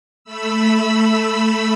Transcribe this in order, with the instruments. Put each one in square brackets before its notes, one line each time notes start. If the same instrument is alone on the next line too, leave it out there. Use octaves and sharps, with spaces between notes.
[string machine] A3 B5 E6